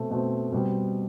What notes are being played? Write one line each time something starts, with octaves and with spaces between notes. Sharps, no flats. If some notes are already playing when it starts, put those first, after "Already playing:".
Already playing: B2 A3 C4
B2 A3 C4
B2 G3 C4